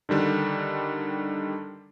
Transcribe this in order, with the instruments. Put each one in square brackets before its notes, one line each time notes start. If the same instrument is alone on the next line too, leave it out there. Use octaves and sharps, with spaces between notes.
[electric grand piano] D3 D#3 G3 D4